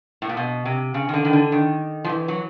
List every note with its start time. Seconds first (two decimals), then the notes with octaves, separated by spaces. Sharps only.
0.22 A2
0.29 A#2
0.37 B2
0.65 C3
0.94 C#3
1.09 D#3
1.14 D3
1.25 D#3
1.33 D3
1.52 D#3
2.04 F3
2.09 E3
2.28 F#3